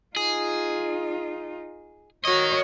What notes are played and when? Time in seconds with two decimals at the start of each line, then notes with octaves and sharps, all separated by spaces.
0.16 D#4 F4 G#4
2.25 F#4 A#4 C#5 D#5